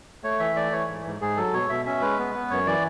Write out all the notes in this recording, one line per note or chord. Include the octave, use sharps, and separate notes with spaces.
A3 C#5
E3 E5
A3 D5
E3 C#5
G#2
G#2
G#2 G#4
F#3 A4
B2 C#5
B2 E5
C#4 E5
G#3 B4
B3
B3
F#2 C#5
E3 D5